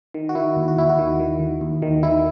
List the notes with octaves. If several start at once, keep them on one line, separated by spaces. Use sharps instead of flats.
D#3
F#4
D#3 E4
D#2
F#4
D#2 E4
F#4
D#3
D#3
D#3
D#2
D#3
D#3 E4